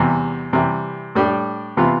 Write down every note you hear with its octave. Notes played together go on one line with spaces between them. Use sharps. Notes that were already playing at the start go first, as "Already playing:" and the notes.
Already playing: E2 C3 E3 G3
C3 E3 G3
A2 G3 D4 G4
C3 E3 B3 F4